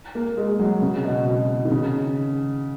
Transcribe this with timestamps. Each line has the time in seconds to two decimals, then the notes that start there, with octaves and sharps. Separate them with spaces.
0.15 A#3
0.37 G#3
0.59 F#3
0.82 C#3
1.04 B2
1.26 B2
1.65 D#3
1.71 C#3